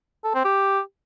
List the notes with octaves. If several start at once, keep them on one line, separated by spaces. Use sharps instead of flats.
A4
C4
G4